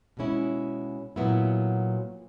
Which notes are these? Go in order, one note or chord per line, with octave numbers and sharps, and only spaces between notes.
B2 G#3 C#4 E4
A#2 F#3 B3 E4